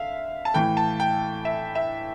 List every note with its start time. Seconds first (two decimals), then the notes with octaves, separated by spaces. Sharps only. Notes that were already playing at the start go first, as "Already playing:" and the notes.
Already playing: D3 E5 F5
0.45 A5
0.54 A2 E3 A3 G5
0.77 A5
1.00 G5
1.45 E5
1.75 E5